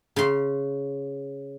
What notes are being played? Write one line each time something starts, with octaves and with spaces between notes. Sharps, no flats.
C#3 C6